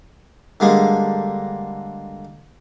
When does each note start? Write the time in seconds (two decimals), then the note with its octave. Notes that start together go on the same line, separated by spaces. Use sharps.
0.60 D3 G3 G#3 A#3